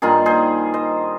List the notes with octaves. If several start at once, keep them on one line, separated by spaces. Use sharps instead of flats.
G2 D#3 A#3 D#4 F4 G#4
G#4 C5
C5 D#5